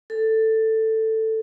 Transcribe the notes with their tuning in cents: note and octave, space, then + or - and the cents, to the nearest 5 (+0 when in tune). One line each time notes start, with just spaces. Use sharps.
A4 +10